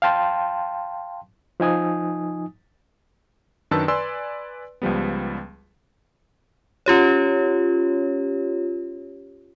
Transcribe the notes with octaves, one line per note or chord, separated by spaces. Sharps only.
F5 G5 A5 C6
F3 D#4 G#5 D#6
F#2 D#3 D4 B4 A5 E6
B4 D5 G#5 C6 E6
C#2 F3 G3 B3
C#4 F4 G4 C#5